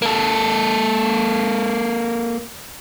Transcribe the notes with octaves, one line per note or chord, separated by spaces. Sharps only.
A#3 A4